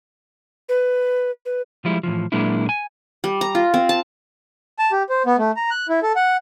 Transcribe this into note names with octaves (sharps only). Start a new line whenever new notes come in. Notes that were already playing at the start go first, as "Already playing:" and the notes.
B4
B4
F3 G3 G#3 E4
A2 E3 F3
A#2 F#3 G#3 A#3 D4 E4
G#5
G3
A#5
F4
C4
A5
A5
G4
C5
B3
A3
A#5
F#6
E4
A4
F#5